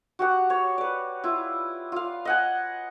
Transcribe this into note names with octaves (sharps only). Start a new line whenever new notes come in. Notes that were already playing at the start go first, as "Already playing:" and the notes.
F#4 G4 F#5
C#5
B4 D5
E4 F4
F4 F5
D#5 F#5 G#5